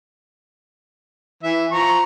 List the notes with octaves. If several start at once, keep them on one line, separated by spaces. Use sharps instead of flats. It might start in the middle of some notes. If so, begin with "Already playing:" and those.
E3 E5
F3 A#5 C#6